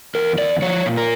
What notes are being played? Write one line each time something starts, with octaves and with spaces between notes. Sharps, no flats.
E2 A#4
E2 D5
F3 C#5
A#2
A#4